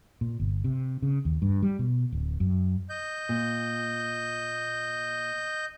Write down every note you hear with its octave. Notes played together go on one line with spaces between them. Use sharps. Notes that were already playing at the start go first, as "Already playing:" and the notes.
A#2
G1
C3
C#3
D#2
G2
G3
B2
D1
F#2
D#5 G6
A#2